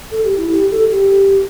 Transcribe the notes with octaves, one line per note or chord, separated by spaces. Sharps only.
A4
G4
E4
G4
A4
G4